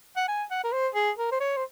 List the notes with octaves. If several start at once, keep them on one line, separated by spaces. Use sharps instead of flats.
F#5
G#5
F#5
A#4
C5
G#4
A#4
C5
C#5
C5